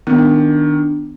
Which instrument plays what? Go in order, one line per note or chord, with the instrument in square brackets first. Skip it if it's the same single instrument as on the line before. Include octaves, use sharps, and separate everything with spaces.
[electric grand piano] D#3 [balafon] B3 [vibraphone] D4